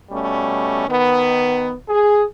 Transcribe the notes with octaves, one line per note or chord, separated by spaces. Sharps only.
B2 G3 A3 C#4
D#3 B3
G#4